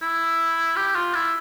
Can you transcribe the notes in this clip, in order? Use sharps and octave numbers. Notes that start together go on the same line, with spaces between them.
E4
G4
F4
E4